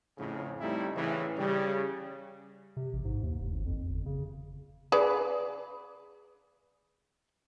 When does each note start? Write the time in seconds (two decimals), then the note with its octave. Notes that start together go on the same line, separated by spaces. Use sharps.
0.17 F2 A2 C#3
0.60 G3 A3 C4 D#4 E4
0.95 A2 C#3 E3
1.38 C#3 G3
2.77 C3
2.93 A1
3.05 G#2
3.23 D#2
3.40 F1
3.52 G#1
3.66 F2
3.89 G1
4.06 C#3
4.92 G#4 B4 D5